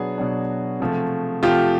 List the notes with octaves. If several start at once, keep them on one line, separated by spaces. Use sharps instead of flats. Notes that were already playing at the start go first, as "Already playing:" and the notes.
Already playing: B2 F#3 B3 D4 F#4 G#4
B2 F#3 B3 D4
C3 F3 A3
C3 F3 A3 F4 G4